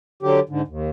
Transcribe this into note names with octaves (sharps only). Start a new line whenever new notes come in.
D3 F#3 G4
G#2 D3
D#2